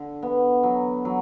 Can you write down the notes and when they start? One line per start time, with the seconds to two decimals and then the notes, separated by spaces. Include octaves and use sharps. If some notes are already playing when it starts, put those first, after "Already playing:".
Already playing: D3
0.22 B3
0.63 F#3
1.05 F#3